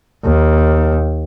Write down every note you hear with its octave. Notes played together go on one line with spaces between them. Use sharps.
D#2